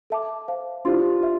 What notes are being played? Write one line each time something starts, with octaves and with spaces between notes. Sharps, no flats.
A4 E5 A5 D6
C5 F5 A5
D4 E4 F4 G4 C5 F5 C6
E5